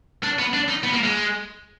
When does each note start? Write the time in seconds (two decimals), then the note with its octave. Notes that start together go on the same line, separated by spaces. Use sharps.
0.24 D4
0.39 B3
0.54 D4
0.69 D#4
0.84 B3
0.93 A#3
1.03 G#3